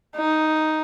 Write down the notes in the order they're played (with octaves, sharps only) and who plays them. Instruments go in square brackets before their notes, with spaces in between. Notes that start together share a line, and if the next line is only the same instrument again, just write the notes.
[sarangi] D#4